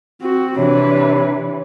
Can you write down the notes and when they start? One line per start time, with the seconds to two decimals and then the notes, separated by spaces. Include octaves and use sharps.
0.22 C4 F#4
0.56 C3 E3 D4 B4 C#5